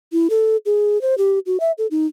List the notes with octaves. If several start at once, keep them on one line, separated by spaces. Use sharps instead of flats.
E4
A4
G#4
C5
G4
F#4
E5
A4
D#4